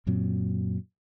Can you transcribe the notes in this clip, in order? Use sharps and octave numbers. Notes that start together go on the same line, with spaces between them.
F#2 A#2 F#3 C4